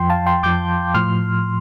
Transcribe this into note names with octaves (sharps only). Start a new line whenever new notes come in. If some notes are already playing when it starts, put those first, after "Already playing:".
Already playing: F2 F3 G5 C6
F5 A5
G5 C6
F2 F3 D6 G6
A2 F3 C6 F6